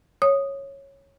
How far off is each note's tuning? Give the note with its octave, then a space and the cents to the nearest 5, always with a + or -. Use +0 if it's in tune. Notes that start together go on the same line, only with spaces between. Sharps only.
C#5 -10 D#6 -10